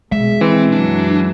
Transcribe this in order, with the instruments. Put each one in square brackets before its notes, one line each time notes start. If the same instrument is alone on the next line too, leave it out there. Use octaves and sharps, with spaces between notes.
[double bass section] B2 [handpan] G#3 [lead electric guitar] E5
[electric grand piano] E3 [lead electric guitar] C4
[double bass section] F#2 F#3 [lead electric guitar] D4